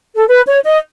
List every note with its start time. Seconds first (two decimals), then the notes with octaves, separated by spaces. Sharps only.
0.16 A4
0.28 B4
0.46 C#5
0.65 D#5